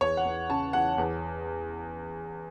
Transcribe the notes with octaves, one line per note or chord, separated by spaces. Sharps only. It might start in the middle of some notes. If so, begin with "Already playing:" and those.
E2 C#5
F#5
E2
C#3 A5
E2 F#5
E2